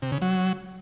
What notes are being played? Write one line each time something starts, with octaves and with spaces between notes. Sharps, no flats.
C3
C#3
F#3